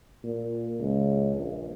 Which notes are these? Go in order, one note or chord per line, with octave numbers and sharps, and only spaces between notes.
A#2
C#2
A#1